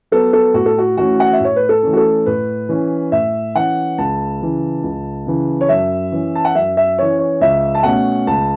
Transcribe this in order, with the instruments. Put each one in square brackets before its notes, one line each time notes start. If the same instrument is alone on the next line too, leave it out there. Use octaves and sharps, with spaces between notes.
[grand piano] F#3 B3 A4
A4
A2 F#4
A4
F#4
E3 A3 C#4 F#4
F#5
E5
A2 C#5
B4
A4
E3 A3 C#4
F#4
A4
A2 B4
E3 C#4
A2 E5
E3 C#4 F#5
C#2 A5
C#3 E3
C#2
C#3 E3
C#5
F#2 E5
E3 C#4
A5
F#5
F#2 E5
E5
E3 C#4 C#5
C#5
C#2 E5
A5
B2 A3 C#4 F#5
C#2 A5